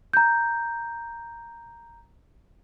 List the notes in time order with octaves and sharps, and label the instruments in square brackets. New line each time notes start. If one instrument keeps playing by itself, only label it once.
[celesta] A#5 G6